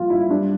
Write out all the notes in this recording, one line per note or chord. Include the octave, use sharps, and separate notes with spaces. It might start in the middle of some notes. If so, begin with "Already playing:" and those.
Already playing: G2 F3 A#3 F4
G2 E4
G3 D4